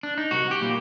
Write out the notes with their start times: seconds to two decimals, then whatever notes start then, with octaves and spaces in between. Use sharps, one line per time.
0.03 D4
0.18 D#4
0.31 C2 F#4
0.51 G4
0.61 A#2 G3 A#3